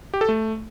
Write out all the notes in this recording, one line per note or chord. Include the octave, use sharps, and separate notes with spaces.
G4
A4
A3